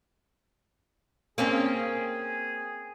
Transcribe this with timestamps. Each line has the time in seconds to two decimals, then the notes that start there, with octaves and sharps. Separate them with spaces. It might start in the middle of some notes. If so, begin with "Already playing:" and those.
1.38 A#3 C4 C#4 G#4